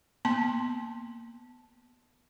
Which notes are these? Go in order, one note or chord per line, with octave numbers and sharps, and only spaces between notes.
A#3 B3 A5 C6